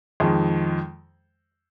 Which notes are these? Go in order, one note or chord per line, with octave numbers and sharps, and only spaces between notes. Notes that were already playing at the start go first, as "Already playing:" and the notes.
F2 D#3 G#3